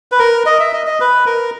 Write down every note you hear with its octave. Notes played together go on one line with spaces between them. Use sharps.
B4
A#4
D#5
E5
D#5
D#5
B4
A#4